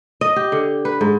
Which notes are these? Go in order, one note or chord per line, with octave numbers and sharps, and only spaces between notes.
D#5
G4
D3
B4
G#2